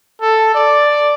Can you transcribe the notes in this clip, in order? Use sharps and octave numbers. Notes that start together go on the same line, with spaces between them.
A4
D5